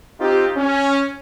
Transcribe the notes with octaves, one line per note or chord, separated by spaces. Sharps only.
C4 D#4 F4 G4
C#4